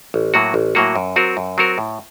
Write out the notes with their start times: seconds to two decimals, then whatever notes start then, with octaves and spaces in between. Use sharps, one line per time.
0.14 A1
0.34 A2 F#3 A#3 F#4
0.54 A1
0.75 A2 F#3 A#3 F#4
0.96 F#2
1.16 F#3 C4 F#4 A#4
1.37 F#2
1.58 F#3 C4 F#4 A#4
1.78 A2